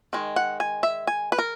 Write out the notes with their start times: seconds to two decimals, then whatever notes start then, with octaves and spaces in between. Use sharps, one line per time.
0.13 D#3 G#3
0.36 F#5
0.60 G#5
0.83 E5
1.07 G#5
1.32 B4
1.38 A#4